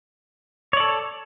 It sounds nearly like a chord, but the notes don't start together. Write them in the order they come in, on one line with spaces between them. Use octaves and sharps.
C#5 D5 A4